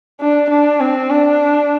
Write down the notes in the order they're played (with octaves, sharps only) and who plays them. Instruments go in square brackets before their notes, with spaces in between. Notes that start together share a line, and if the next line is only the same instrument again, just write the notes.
[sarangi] D4
D4
C4
D4